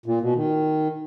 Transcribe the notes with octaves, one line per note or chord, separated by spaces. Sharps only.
A#2
B2
D#3